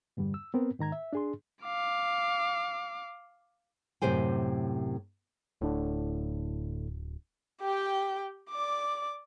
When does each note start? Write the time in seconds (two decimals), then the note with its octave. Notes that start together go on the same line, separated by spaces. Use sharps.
0.17 E2 G2 D3 G3
0.34 E6
0.54 B3 C4 A#4
0.79 G#2 D#3 A#5 G#6
0.92 E5
1.13 D4 G#4 C6
1.65 F5 D6
4.02 F#2 A2 C3 G4 C5 G#5
5.61 D1 A2 D3 D4
7.61 G4 G5
8.50 D5 D6